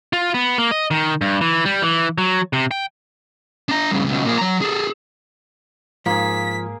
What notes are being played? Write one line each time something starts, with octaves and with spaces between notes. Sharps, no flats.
F4
B3
A#3
D#5
D#3
G2
E3
G3
E3
F#3
C3
G5
D4 A#5
G2 C#3
C#2 B2
A#2 G#4
F#3 A#5
G#4 A4
G#2 F3 A#3 G#4 B6